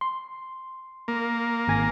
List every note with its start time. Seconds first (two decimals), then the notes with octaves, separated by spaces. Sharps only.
0.01 C6
1.08 A#3
1.68 G#1 G#5 A#6